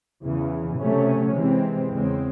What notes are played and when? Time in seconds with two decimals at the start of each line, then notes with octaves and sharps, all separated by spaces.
0.24 E2 C#3 E3
0.80 C3 F#3 A3 C#4
1.36 C3 E3 G#3 C4
1.93 E2 C#3 G#3 C4